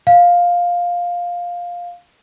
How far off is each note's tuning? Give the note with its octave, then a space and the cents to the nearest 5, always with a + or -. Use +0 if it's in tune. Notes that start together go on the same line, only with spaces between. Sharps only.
F5 +10